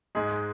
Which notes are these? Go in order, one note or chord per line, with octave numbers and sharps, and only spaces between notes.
G#2 G#3 G#4